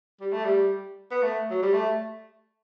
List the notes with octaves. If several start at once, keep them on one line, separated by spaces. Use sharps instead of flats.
G3
A3
G3
B3
A3
F#3
G3
A3